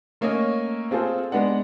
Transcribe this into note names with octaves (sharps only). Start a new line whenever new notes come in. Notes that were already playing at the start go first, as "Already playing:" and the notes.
A3 A#3 C#4 C#5 D#5
C4 F4 G#4 A4 C5
G#3 B3 D4 F#5